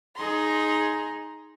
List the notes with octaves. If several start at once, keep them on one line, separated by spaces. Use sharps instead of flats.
D#4 G#4 A#5 C6